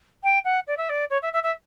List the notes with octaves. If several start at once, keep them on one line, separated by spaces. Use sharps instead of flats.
G5
F#5
D5
E5
D5
C#5
E5
E5
E5